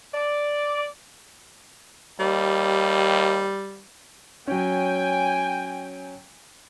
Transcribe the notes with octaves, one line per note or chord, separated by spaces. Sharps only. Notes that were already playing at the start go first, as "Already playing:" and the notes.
D5
D#2 G3
F#3 C#4 G5 G#5